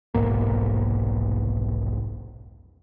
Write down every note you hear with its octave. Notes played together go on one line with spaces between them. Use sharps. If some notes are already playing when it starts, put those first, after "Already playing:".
F1 B1 G#2 A#3